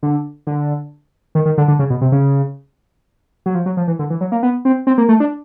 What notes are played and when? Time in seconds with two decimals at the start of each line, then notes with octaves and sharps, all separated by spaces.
0.03 D3
0.47 D3
1.35 D#3
1.45 D#3
1.58 D3
1.68 D3
1.79 C#3
1.90 B2
2.01 C3
2.12 C#3
3.46 F#3
3.55 F3
3.66 F#3
3.77 F3
3.88 E3
3.99 D3
4.10 E3
4.21 F#3
4.32 A#3
4.43 B3
4.65 C4
4.87 C4
4.98 A#3
5.09 A3
5.20 D4